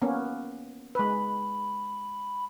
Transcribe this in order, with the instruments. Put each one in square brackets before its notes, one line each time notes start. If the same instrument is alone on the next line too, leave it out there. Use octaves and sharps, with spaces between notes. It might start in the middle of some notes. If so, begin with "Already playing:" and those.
[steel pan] A#3 B3 C#4
[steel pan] G#3 B4 [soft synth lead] B5